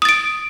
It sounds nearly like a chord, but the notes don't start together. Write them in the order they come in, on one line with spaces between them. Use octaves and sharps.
D#6 A6 D7